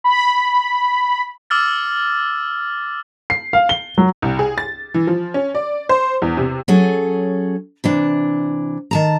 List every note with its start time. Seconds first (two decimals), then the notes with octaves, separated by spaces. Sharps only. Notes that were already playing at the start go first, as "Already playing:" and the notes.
0.04 B5
1.50 D6 E6 F6 A6
3.30 C7
3.53 F5
3.69 G7
3.98 F#3
4.22 C2
4.39 G#4
4.58 A6
4.94 E3
5.07 F3
5.34 C#4
5.55 D5
5.89 C5
6.22 E2
6.37 C3
6.68 F#3 C#4 G#4 A4
7.84 C3 E3 D4
8.91 D#3 A5 A#5